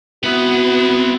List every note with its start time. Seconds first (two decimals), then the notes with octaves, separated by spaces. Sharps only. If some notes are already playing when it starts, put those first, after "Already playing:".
0.24 B3 C4 E4 F#4 B5